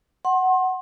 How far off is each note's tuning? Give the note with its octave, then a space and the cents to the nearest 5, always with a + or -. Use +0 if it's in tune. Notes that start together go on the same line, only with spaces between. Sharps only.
F#5 +10 C6 +30